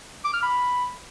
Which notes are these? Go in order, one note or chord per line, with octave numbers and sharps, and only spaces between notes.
D6
F6
B5